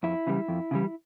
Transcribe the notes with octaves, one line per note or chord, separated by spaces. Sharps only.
F2 E4
C#3 E3 G3
F2
C#3 E3 G3